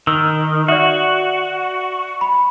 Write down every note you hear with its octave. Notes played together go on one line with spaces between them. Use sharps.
D#3 E6
F#4 D5 E5
B5